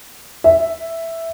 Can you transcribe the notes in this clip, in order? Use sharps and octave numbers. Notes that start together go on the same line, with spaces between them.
E5